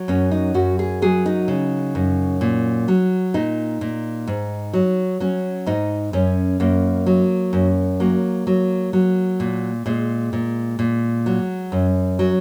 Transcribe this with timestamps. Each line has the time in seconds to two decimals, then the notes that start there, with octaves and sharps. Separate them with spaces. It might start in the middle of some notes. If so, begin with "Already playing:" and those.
Already playing: F#3
0.08 F#2 C#4
0.31 D#4
0.54 F#2 F#4
0.79 G#4
1.02 F#3 G#4
1.26 D#4
1.48 C#3
1.95 F#2
2.41 A#2
2.88 F#3
3.34 A#2 D#4
3.81 A#2
4.27 G#2
4.73 F#3
5.20 F#3 C#4
5.67 G#2 D#4
6.13 F#2 C#4
6.60 F#2 A#3
7.06 F#3
7.53 F#2
8.00 F#3 A#3
8.47 F#3
8.93 F#3
9.40 A#2
9.86 A#2 G#3
10.33 A#2
10.79 A#2
11.26 F#3
11.72 F#2
12.19 F#3